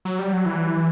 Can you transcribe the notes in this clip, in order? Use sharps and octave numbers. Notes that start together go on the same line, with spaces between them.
F#3
G3
F#3
E3